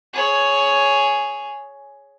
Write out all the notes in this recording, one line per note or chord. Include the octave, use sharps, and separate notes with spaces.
G#4 C#5